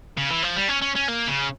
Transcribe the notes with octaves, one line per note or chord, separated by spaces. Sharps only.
C#3
E3
F3
G3
C#4
C#4
C#4
A#3
C#3